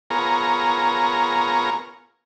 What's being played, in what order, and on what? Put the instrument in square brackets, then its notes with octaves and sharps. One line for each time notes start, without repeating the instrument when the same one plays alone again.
[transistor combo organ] B3 F4 G#4 A#4 C#5 A#5